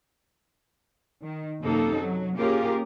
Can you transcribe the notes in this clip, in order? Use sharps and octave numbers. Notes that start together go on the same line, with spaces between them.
D#3
F#2 C3 A#3 D#4 A4
F#3
A#3 C#4 F4 G4 G#4 A#4